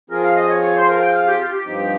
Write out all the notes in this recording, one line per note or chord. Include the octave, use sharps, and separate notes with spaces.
F3 C4 F4 G#4 A#4
F5
D#5
C#5
C#5
C5
A#4
F5
G5
F5
G4
F4
G4
G2 F3 C4 D#4